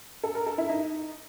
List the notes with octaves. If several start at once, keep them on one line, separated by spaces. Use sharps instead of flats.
A4
A#4
A4
E4
D#4